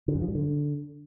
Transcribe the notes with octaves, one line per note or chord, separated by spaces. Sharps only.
D3
F#2
F3
G2
D3